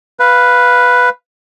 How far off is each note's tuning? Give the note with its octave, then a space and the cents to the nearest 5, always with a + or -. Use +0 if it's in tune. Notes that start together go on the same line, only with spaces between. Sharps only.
B4 +0 F5 +0